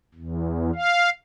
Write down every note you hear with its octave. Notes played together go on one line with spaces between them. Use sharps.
E2
F5